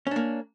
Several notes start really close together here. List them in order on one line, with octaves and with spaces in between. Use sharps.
C#4 D4 A#3